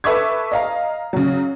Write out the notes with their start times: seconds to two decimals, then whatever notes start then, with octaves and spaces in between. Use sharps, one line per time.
0.04 A4 B4 E5 C#6 D6 G#6
0.52 D#5 F5 A#5
1.13 C#3 F#3